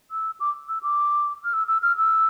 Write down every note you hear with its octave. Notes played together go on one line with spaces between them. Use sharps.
E6
D6
E6
D6
F6
E6
E6
F6
E6